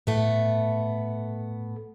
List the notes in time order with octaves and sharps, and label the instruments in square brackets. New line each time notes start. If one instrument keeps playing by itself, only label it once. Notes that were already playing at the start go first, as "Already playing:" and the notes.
[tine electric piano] A2 [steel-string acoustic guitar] A3 B3